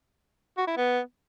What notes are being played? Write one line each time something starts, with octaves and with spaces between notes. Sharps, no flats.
F#4
E4
B3